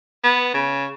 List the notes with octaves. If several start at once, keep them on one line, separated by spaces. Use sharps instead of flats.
B3
C#3